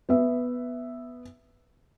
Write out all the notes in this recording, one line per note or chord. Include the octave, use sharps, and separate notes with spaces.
B3 E5